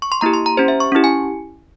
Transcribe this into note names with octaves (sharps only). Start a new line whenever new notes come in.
C#6
C6
A#3 E4 G4 A#5
C6
A#5
C#4 G4 C5
E5
C#6
C#4 E4 G4
G#5